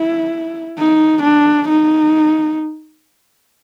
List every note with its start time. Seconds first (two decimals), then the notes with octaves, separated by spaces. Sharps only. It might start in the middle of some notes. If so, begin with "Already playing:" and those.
Already playing: E4
0.79 D#4
1.23 D4
1.69 D#4